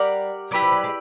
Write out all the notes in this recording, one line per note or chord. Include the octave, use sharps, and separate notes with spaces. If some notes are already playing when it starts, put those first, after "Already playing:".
Already playing: G3 G4 A#4 D5 F#5
F#3 E4 G4 B4 D5
F3
F#3
G#3